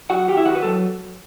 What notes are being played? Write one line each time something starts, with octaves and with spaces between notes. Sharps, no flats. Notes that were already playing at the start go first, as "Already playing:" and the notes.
F#2 F#4 F#5
D#3 G4 G5
E4 E5
D#3 F#4 F#5
B4
F#3 A4